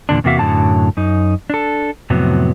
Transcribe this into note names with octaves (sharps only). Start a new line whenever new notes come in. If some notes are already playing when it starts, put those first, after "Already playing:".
E2 A#2 D3 D4
E2 C3 A#3 F#4 E5 F5
F#2 A2 D3 F#3 A5
F#2 D#4
D4 A4
F2 A2 C3 F#3 B3